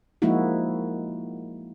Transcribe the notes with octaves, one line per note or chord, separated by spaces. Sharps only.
F3 G#3 A#3 D#4 E4 F#4